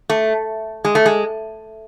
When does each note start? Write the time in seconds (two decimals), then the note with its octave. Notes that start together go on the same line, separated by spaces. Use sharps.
0.10 A3
0.85 G#3
0.95 A3
1.06 G#3